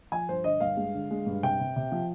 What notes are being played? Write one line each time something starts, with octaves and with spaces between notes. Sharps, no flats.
F3 G#5
G2 C5
D3 D#5
G2 F5
G#3
D3
G#3
G2
C3 G5
C3
C3
F3